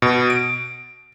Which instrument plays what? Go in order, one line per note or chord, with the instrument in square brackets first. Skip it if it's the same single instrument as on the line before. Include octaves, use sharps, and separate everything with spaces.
[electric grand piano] B2
D7